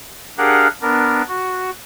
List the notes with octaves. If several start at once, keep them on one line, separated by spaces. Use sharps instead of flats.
D4 G4 G#4 A#4 F5 F#5
B3 D4 A#4
F#4